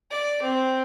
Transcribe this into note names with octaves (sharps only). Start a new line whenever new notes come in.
D5
C4